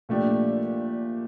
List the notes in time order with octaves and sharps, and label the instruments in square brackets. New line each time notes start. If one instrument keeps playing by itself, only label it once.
[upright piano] A#2 F3 A3 D4 G4